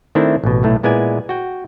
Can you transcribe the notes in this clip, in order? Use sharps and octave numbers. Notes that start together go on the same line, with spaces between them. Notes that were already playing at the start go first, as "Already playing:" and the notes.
D#3 A3 C4 D4 E4
A1 B2
B1 A2 A3
A#2 G#3 B3 E4 D5 G#5
F#4 G5